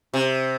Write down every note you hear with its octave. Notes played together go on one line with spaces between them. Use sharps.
C3